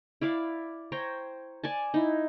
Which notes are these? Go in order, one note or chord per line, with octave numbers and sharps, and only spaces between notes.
E4 D5 F5 D6
C5 C#5 G5 A#5
D5 G#5 A5
D#4 E4